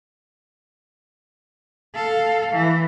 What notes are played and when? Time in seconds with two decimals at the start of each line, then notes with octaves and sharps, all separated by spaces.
1.94 A4 F5
2.53 E3